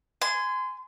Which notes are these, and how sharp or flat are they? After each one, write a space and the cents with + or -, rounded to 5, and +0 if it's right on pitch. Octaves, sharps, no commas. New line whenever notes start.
G#5 +0 C6 -30